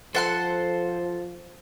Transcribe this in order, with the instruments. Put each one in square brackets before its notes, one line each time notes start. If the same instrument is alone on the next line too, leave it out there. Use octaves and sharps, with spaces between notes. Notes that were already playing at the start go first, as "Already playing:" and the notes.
[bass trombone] F3 [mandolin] A4 F#5 C6 [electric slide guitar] C5